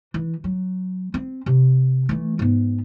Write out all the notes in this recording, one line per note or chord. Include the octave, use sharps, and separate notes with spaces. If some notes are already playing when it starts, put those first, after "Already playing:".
E3
F#3
C4
C3
E3 A3
G#2 B3